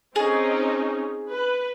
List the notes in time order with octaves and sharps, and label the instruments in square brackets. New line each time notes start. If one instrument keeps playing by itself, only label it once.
[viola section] C4 C#4 D#4 [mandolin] G#4
[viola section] B4